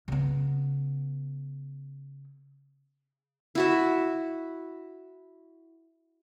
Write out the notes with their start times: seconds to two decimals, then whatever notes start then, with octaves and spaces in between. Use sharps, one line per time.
0.08 C#3 B3
3.55 E4 F#4 E5